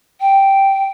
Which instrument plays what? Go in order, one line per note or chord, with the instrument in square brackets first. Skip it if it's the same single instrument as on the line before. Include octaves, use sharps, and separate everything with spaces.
[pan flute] G5